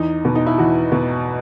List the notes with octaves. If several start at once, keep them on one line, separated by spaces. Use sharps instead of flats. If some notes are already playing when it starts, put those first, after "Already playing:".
Already playing: E2 D#4
B2
D#4
E4
E2 F#4
B2